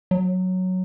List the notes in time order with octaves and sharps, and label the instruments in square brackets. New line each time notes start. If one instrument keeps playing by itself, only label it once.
[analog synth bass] F#3